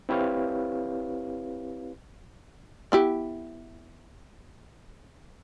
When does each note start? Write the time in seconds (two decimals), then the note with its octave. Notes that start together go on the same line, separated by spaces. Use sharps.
0.09 C4 E4 G4 B4 C#5 F5
2.92 B3 E4 G4